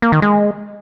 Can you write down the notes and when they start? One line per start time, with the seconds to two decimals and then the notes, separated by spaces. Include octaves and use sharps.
0.02 A#3
0.12 D#3
0.22 G#3